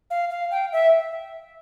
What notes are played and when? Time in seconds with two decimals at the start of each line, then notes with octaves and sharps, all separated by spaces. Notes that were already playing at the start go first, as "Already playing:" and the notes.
0.10 F5
0.30 F5
0.51 G5
0.72 E5